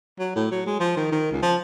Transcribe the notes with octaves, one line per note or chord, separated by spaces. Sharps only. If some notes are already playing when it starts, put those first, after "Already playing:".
F#3
A2
F#3
G#3
F3
D#3
D#3
C#2
F3